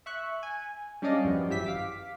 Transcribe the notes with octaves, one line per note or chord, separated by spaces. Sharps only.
E5 C#6 F#6
G#5
G3 C#4 D4 D5 D#5 F5
F#2 F3 G3 B3
G#1 E3 G4 E5 B6
F5 D6 B6